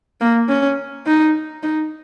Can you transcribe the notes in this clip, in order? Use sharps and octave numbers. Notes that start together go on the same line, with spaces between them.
A#3
C#4
D#4
D#4